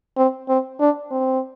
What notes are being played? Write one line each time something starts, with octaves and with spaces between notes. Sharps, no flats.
C4
C4
D4
C4